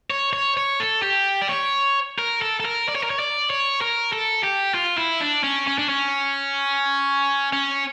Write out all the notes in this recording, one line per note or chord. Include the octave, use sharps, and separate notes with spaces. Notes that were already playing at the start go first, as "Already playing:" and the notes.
C#5
C#5
C#5
A4
G4
D5
C#5
A#4
A4
A4
A#4
D5
C#5
A#4
C#5
D5
C#5
A#4
A4
G4
F4
E4
D4
C#4
C#4
D4
C#4
C#4